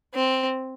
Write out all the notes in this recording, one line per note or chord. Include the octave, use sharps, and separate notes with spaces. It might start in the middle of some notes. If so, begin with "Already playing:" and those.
C4